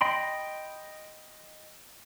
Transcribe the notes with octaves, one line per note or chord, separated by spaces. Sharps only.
D#5 G5 B5 C6